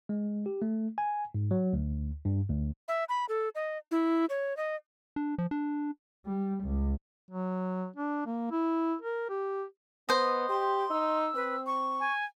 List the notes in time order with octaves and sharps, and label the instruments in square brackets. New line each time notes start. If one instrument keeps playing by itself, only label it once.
[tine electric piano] G#3
G4
A3
G#5
G#2
F#3
D2
G2
D2
[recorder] E5
B5
A4
D#5
E4
C#5
D#5
[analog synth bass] D4
F3
D4
[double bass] G3
C#2
[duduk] F#3
D4
A#3
E4
A#4
G4
[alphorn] B3 [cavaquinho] C5 D#5
[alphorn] G4 [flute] C6
[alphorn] D#4 [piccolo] E6
[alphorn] C4 [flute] B4
[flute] C#6
[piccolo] G#5